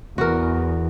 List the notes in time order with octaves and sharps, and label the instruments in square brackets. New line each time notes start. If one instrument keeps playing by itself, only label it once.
[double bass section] E2 [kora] F#4 A#4